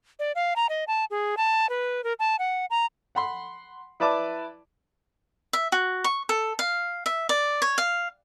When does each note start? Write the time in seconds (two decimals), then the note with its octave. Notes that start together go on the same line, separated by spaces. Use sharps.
0.19 D5
0.35 F5
0.56 A#5
0.69 D#5
0.88 A5
1.10 G#4
1.37 A5
1.69 B4
2.04 A#4
2.19 A5
2.39 F#5
2.70 A#5
3.15 F#5 B5 C6
4.00 E4 B4 D5 A5 B5 D6
5.53 E5
5.72 F#4
6.04 C#6
6.29 A4
6.59 F5
7.06 E5
7.29 D5
7.62 C#5
7.78 F5